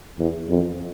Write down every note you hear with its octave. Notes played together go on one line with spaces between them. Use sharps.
E2
F2